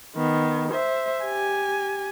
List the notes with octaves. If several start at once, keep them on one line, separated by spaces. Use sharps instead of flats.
D#3 B3
C5 E5
G4 G#5